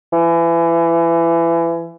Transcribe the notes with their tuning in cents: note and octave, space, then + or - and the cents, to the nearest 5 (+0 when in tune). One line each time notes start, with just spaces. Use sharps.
E3 +25